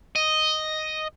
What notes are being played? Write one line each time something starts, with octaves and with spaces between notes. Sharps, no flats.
D#5